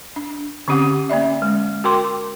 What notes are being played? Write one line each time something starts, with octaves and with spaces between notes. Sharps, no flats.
D4
D3 C4 C#4 G4 F#5 D6
A#3 C#4 D5 E5
G#3
F#4 A#4 G5 C6 D6